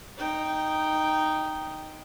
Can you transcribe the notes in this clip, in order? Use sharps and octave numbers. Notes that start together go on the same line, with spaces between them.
D#4 G5